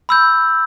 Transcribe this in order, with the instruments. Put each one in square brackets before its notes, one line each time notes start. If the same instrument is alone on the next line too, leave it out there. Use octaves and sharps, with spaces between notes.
[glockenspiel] B5 E6 G6